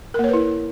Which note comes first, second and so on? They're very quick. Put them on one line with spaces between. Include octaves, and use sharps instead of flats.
A#4 A#3 C#5 B4 E4